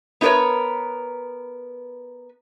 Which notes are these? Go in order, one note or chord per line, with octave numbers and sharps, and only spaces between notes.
B3 D#4 F4 A#4 B4 C#5